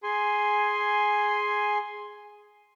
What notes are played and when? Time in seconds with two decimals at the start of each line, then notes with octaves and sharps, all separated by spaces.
0.03 G#4 G#5 C6